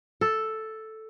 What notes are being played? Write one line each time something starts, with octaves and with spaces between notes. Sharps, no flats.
A4